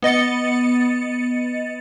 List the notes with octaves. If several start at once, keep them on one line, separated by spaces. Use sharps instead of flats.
B3 D#5 A6 C#7